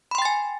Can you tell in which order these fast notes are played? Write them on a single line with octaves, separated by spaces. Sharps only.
B5 C6 G5 A6 G#5